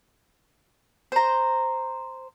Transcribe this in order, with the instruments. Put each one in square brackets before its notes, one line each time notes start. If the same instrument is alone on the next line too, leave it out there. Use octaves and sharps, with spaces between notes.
[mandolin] C5 A#5